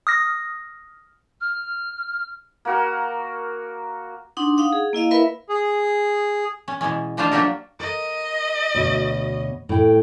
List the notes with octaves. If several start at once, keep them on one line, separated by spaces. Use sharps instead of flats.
D#6 F6 A#6
F6
A#3 F#4 A#4
D4 D#4 F#5 C6 D#6
D#4 F5 F#5 D#6
G#4
A#3 E4 D#5 F5
E4 A#4 B4 E5 B5
G#4
C#4
B2 E3 G#3 C#4
B2 A3 D4 F4 C5 F5
F#3 A#3 D4 G4 A4 A#4
A#4 D#5
D2 B2 C#5
A2 G5